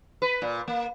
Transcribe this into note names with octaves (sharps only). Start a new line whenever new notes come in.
B4
A#2
A#3